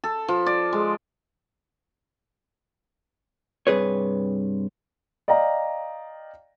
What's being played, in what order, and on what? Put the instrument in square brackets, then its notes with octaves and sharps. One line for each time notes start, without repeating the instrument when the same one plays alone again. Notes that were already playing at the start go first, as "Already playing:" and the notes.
[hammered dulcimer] A4
F3
D5
G#3
[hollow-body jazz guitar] G2 C3 F#3 G#4 B4 C#5
[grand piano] D5 D#5 F5 G5 A#5